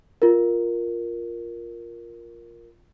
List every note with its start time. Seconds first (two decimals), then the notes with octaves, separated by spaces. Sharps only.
0.22 F4 A#4